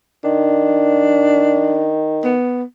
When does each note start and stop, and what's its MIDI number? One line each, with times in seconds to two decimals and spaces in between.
0.24 2.35 51
0.24 1.97 62
2.24 2.63 59